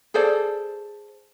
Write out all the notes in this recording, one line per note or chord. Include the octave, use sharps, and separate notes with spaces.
G#4 A4 C5 D5